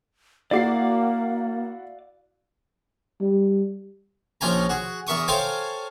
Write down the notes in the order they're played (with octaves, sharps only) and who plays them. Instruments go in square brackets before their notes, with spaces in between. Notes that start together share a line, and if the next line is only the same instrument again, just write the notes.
[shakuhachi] A#3 [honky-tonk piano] E4 F#4 C7 [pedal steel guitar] D5 F5 D6
[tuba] G3
[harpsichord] A#1 F3 C#4 G5 G#5 A#5
F#4 G#4
E2 A#4 E5 C#6 D#6
A4 C5 C#5 F5 G5 G#5